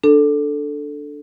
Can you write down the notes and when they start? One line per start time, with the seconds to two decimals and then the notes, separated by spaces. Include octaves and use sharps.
0.03 D4 A4